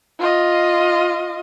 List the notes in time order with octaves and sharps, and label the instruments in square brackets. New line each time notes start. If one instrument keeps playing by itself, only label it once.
[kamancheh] F4 D#5